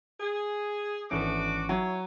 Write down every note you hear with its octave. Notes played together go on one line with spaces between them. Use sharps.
G#4
G#1 E3 A3 B3 C#4 D4 F#4 D6
F#3 E4 C#5